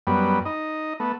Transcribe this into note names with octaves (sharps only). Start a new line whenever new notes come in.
F#2 G3 B3
D#4 D#5
A3 B3